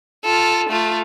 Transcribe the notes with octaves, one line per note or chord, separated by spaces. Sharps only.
F4 A4
A3 F4